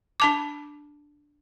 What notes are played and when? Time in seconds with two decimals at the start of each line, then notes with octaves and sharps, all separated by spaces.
0.20 D4 A5 D6